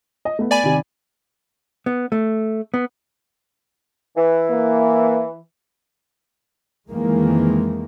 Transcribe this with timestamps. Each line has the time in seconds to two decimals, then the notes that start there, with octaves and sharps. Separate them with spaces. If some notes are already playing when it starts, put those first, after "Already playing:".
0.25 D#5
0.39 A3 B3
0.51 D5 G#5 B5
0.64 C3 D#3
1.86 B3
2.12 A3
2.74 B3
4.17 E3
4.50 A#3
6.90 F2 D#3 E3 G#3 A#3